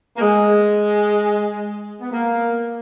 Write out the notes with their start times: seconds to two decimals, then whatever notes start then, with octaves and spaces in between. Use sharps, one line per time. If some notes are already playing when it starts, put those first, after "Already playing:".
0.16 A#3
0.21 G#3
2.01 B3
2.12 A#3